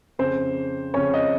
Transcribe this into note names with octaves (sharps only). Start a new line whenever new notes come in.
F2 C#3 C5
F2 C#3 C#5
D#5